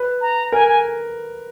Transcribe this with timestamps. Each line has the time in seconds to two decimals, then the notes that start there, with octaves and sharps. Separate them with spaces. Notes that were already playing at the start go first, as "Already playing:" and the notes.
Already playing: B4
0.21 A#5
0.52 A#4 G#5
0.68 G#5